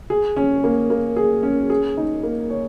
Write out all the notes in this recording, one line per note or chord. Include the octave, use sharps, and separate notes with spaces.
G#4
C#4
A#3
A#3
G#4
C#4
G#4
D#4
A#3
C#5